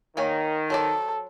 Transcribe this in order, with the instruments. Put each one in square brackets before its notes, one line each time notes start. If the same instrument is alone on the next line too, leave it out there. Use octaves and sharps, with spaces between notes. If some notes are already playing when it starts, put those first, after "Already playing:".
[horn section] D#3 [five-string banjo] A#3 C#5 G#5
[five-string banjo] F#3 C5 D5 [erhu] A4